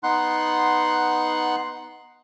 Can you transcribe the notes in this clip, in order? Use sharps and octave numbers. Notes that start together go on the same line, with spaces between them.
B3 D#4 F#5 C6 F#6